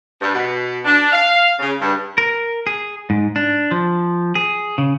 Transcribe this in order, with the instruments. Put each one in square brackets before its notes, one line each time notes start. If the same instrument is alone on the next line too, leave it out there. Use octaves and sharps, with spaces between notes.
[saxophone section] G2
B2
D4
F5
C#3
G2
[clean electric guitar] A#4
G#4
G#2
D4
F3
G#4
C#3